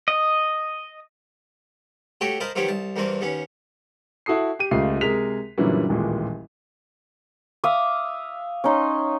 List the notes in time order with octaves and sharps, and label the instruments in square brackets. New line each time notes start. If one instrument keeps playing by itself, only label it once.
[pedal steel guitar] D#5
[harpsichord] A3 F#4 G4 A4 C#5 G5
A#4 C5 D#5 F5 A5 B5
D#3 F3 F#3 B3 G4 C#5
C2 A5
E2 G2 A#3 C4 D4
D#2 B3 C#4
[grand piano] E4 F#4 A4 D#6 C7
G4 D#7
C#2 A3 F4 G4 C7
C3 G#3 G#4 A#4 B6 F7
F#2 A#2 D3 E3 F#3 G3
D#1 A1 A#2 G#3
[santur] E5 F5 D6 D#6
C#4 D#4 C6